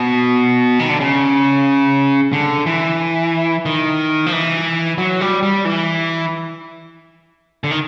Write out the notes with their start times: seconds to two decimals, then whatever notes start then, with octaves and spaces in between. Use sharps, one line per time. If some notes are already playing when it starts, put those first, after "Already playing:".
Already playing: B2
0.79 D#3
0.90 D3
1.00 C#3
2.33 D3
2.66 E3
3.66 D#3
4.26 F3
4.33 E3
4.98 F#3
5.21 G3
5.43 G3
5.65 E3
7.64 D3
7.71 D#3